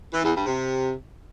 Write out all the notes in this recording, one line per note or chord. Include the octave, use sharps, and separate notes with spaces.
E3
E2
G2
C3